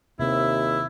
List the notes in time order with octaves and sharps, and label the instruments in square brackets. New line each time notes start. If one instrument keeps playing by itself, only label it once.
[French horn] D#2 [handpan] C3 D#3 C4 [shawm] E4 [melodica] E5